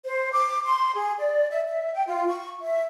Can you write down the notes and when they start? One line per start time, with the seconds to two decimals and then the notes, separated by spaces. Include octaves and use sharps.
0.05 C5
0.33 D6
0.65 C6
0.95 G#4
1.18 D5
1.51 E5
1.67 E5
1.94 G5
2.07 F4
2.27 C#6
2.60 E5